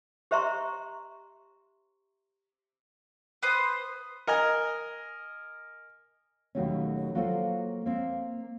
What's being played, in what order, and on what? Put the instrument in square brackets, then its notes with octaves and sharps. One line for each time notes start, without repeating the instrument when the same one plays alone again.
[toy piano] G4 C5 E5 A#5 C6 C#6
[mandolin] B4 C5 D#6
[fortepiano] A#4 D#5 G#5 A#5
[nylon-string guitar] D#2 B2 D#3 F#3 A3 C#4
F#3 A#3 F4 A4 B4 C5
A#3 C4